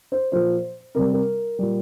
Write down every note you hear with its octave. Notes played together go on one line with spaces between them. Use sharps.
C5
A#2 F3 C5
C3 G3 A#4
A#4
A#2 G3